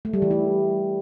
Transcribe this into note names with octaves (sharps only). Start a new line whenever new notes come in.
A3
G3
E3
E4